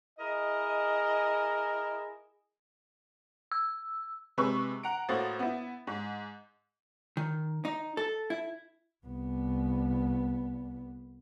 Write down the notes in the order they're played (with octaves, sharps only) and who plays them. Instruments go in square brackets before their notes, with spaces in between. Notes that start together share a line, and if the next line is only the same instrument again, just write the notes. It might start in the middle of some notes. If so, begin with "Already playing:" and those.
[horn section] E4 G#4 A#4 D#5
[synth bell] E6
[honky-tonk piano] C3 G#3 B4 C#6 E6
F#5 A#5 D7
A2 A#3 F#4 C5 D#6 A6
B3 E4
G#2
[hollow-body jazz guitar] D#3
D#4
A4
E4
[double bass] C2 B3